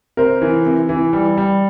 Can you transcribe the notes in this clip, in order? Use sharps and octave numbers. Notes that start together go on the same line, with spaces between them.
C3 A#4 C5
E3
C3
E3
G3
G3